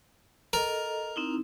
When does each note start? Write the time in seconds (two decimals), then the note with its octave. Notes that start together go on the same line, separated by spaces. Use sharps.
0.53 A4 A#4 D#5
1.16 C4 D#4 E4